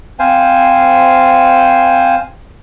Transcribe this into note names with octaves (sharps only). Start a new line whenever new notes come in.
C4 C5 F5 G#5